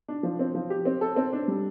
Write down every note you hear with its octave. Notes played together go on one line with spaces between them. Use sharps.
D4
F3
C4
F3
G4
C4
A4
C4
D4
G3